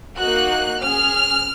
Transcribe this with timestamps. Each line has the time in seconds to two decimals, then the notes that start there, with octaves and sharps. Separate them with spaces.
0.18 A#3 D#4 F#4 F#6
0.80 C#4 G#4 F6